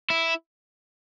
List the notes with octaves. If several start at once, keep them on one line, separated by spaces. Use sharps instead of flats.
E4